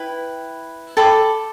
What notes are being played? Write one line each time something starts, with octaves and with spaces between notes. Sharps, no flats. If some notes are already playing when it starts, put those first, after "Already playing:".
Already playing: E4 B4 G5
A4 G5 B5 D6